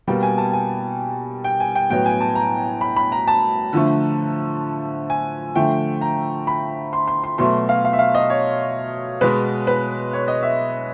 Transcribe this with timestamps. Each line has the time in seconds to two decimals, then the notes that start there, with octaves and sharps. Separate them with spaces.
0.08 B2 G3 A#3 G5
0.23 G#5
0.38 A5
0.53 G#5
1.44 G5
1.60 G#5
1.76 G5
1.90 A2 F#3 B3 G5
2.06 G#5
2.21 A5
2.35 A#5
2.81 B5
2.96 B5
3.12 A#5
3.28 A5
3.73 D3 F3 A3
5.10 G#5
5.55 D3 F3 A3 G5
6.01 A#5
6.47 B5
6.93 C6
7.07 C6
7.24 C6
7.38 B2 F#3 A3 C6
7.69 F5
7.85 F5
7.93 E5
7.99 F5
8.15 D#5
8.30 C#5
9.21 B2 G#3 B3 B4
9.67 B4
10.13 C#5
10.28 D#5
10.43 E5